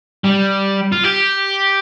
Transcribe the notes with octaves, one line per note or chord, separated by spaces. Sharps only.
G3
F4
G4